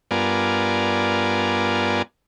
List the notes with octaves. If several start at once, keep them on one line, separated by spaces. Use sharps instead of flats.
G2 B3 F4 A#4 D5 G#5